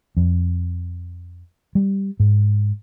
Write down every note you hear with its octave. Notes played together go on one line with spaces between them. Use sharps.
F2
G3
G#2